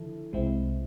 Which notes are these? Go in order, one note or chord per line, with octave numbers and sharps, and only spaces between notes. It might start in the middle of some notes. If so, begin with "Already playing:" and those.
Already playing: D3 F3 E4 A4
C2 C3 G#3 C4 E4